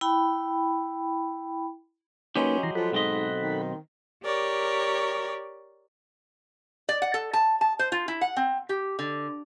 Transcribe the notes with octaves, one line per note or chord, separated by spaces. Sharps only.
E4 G5 B5
F#3 G#3 A#3 C#4 D#4 G4 B4
E3 A#5 C6
F3 A4 F#5 B5
B1 G#2 C4 D#5
D#3
G4 A#4 C#5 D5
D5
F#5
A4
A5
A5
C5
F4
E4
F#5
C4
G4
D3